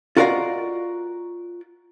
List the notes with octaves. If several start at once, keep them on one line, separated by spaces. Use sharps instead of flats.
F4 F#4 A#4 D5 D#5 F5